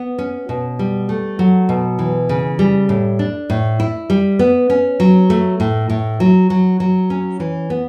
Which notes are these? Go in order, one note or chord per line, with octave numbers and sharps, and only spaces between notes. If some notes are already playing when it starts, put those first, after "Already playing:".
Already playing: B3
C#4
B2
G3
A3
F#3
B2
E3
C#3
G3
A2
D4
A2
E4
G3
B3
C#4
F#3
A3
A2
A2
F#3
F#3
F#3
C#4
E3
B3